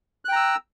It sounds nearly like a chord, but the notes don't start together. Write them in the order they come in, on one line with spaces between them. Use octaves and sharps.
F#6 G5 A#5 E6